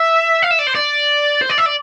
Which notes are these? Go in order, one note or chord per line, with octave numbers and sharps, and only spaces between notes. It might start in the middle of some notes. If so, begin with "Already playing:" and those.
Already playing: E5
F5
E5
D5
C5
D5
C5
D5
E5
D5